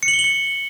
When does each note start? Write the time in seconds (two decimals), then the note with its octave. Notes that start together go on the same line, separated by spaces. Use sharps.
0.03 C#7
0.08 F#7
0.13 G7
0.19 F#7
0.24 C#7